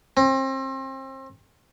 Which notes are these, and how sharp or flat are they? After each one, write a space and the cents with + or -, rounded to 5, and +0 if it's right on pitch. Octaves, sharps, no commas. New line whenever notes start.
C4 +35